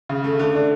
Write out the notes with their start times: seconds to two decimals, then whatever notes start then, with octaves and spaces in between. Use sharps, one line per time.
0.09 C#3
0.24 A3
0.39 D3
0.55 D4